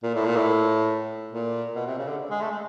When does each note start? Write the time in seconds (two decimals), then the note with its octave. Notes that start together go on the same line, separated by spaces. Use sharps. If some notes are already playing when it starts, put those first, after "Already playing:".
0.03 A#2
0.15 A2
0.25 A#2
0.36 A2
1.33 A#2
1.75 B2
1.87 C3
1.98 C#3
2.08 D3
2.30 G#3
2.41 A3
2.51 G#3